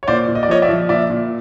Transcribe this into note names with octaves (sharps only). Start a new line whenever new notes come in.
C#5
A#2 C5 D5
A#2
D#5
D5
F3 C#5 D#5
D5 E5
F3
A#2 D5 E5
A#2